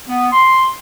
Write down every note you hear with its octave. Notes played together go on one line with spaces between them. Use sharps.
B3
C6